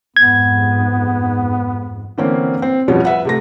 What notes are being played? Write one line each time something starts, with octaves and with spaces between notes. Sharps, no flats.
F2 G#2 B3 G#6
D3 E3 A#3 C4 C#4
C4
F2 B2 F3 G3 C#4
B4 E5 F#5
C3 A3 A#6